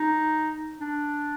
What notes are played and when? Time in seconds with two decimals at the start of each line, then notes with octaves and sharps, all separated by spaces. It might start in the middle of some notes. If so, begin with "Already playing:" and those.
Already playing: D#4
0.81 D4